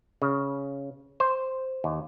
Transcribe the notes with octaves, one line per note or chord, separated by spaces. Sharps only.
C#3
C5
D#2